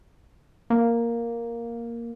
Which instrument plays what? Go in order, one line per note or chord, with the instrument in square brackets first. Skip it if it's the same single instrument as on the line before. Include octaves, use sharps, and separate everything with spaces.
[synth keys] A#3